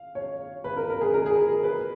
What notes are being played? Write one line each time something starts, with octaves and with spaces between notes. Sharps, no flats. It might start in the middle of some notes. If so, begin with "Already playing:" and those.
Already playing: F5
C#5
B4
A#4
A#4
G#4
A#4
G#4
B4